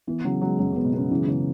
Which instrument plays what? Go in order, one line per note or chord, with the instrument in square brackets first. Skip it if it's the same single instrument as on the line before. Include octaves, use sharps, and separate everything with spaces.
[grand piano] E3 [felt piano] B3
[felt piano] C#3 [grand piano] F#3
[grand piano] F#3 [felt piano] G#3
[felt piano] F#2 [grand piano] F#3
[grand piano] C#3 [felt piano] B3
[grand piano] B2
[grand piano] C#3 [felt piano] B3
[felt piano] C#3 [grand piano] E3
[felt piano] C#3 [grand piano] E3